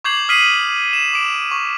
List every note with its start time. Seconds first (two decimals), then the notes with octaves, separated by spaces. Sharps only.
0.04 C#6 D6 G6 G#6 C7 F#7
0.29 D#6 F6 B6 C7 D#7 F#7
0.93 E7
1.13 D6 D7
1.51 C#6